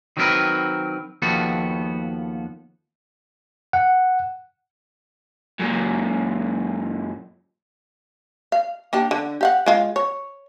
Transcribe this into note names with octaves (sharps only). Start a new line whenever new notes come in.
D#3 F#3 C4 C#4 A#4 B4
D#2 F3 B3 F#4 G4 A4
F#5
F#2 A#2
F5
A#3 D4 G4
D3
G4 F5 F#5
G#3 F4
C#5